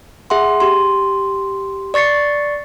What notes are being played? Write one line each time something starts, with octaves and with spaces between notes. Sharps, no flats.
G#4 E5 F#5 C6
G4 C6
D5 C#6 A6 C7 C#7